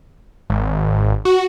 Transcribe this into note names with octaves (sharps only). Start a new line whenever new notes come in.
G#1
F#4